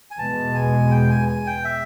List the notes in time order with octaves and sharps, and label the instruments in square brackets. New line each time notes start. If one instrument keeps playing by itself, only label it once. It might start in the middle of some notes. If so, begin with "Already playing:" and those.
[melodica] G#5
[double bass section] E2 B2 G#3 [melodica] A5
[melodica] G#5
G5
G#5
G#5
G5
E5